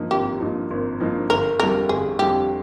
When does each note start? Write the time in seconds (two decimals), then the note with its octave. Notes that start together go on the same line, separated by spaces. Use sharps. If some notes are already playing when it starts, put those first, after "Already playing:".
Already playing: G2 F3 A#3 D#4
0.11 G#1 G4
0.40 G2 F3 A#3 D#4
0.71 G#1
1.00 G2 F3 A#3 D#4
1.30 G1 A#4
1.60 F2 D3 G3 A#4
1.89 G1 G#4
2.19 F2 D3 G3 G4